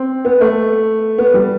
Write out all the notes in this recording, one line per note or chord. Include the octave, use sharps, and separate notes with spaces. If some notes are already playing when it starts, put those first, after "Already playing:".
Already playing: C4
B3
A3
B3
G3